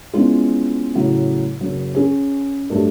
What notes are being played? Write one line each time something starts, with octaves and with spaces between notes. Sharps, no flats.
G#3 B3 C#4 E4 F4
A2 C#3 F#3
F#1 F#3
C#4 G#4
G2 F#3 A3